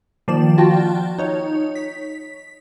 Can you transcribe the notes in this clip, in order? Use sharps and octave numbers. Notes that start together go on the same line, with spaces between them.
D#3 F3 A#3 D5 E7
F4 F#4 G5 A5
D#4 C#5
B6